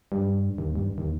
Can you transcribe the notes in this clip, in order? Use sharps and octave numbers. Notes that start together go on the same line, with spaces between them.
G2
D#2
G2
D#2